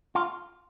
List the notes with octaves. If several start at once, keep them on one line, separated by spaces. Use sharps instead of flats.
F4